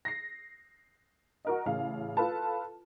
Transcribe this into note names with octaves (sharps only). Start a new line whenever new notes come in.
A#6 C7
F#4 A#4 D#5
A1 C#3 F5
F4 A4 B4 A5